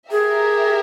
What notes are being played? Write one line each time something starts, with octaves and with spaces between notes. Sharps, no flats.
G4 G#4 A#4 E5